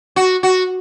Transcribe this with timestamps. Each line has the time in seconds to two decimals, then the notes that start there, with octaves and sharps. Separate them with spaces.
0.16 F#4
0.43 F#4